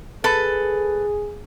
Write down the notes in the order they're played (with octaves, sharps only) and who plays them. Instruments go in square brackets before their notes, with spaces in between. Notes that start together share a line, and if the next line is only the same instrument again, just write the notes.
[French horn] G#4 [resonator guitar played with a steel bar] A4 B4